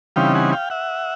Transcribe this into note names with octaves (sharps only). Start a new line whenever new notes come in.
C#3 E3 G3 C4 D#4 F5 G5
F#5 G#5
F5 G5
E5 F#5